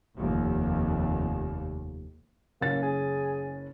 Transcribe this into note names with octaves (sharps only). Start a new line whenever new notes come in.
F1 D#2
F#1 A#3 C#4 A6
G#4